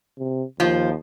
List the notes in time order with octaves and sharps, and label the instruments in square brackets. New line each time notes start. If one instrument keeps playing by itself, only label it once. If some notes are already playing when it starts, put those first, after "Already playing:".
[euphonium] C3
[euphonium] D#2 [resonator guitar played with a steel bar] F3 F4